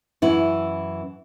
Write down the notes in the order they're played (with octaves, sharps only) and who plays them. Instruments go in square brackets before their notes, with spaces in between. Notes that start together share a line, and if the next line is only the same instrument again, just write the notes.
[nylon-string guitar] F#2 E3 E4